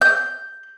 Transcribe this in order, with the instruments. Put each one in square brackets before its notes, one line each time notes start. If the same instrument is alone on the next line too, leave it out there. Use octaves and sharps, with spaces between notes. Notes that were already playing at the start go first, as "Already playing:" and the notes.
[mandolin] G6